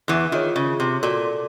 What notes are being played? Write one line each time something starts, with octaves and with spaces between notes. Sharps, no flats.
E2 E3
D#3 F4 G#4 C#5
C#3
C3
A#2 F#4 A4 D5